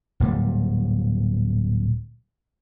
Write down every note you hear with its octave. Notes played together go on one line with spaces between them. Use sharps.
D1 A#2 G3